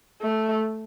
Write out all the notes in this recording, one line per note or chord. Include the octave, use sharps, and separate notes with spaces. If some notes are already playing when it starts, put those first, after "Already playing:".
A3